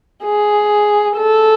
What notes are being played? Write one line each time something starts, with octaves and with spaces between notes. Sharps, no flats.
G#4
A4